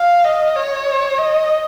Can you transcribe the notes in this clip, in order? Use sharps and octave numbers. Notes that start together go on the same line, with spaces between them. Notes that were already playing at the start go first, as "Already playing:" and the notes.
Already playing: F5
D#5
C#5
D#5